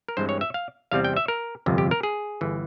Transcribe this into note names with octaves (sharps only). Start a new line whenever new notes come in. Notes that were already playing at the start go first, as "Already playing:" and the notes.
A#4
G2 E3 G#3 C4 C5
C#5
E5
F5
E2 C3 G3 C4 F5
G5
E5
A#4
G1 F2 C3
G4
A#4
G#4
G1 E3